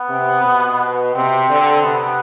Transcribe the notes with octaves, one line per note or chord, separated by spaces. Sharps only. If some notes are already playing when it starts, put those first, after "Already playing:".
Already playing: B3
C3
B2
C3 C4
D3
C3 B3